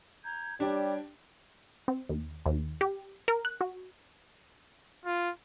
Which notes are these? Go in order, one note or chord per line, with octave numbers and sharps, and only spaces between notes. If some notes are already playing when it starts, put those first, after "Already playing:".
A#5 G6 G#6
G3 D4 G4 C#5 D5 G5
C4
D#2
D#2
G4
A#4
F#6
F#4
F4